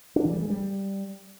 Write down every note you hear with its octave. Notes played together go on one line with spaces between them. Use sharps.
D4
E3
G3
G#3
G3